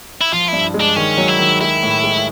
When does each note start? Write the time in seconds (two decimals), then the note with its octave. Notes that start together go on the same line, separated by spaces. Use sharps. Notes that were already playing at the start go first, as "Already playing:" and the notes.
0.21 E4
0.32 F3 F4
0.48 G2 E4
0.74 G#3
0.81 D4
0.96 D#3 C#4
1.18 F#3
1.28 E4
1.39 D#3
1.61 G#3 E4
1.83 A2
2.03 G#3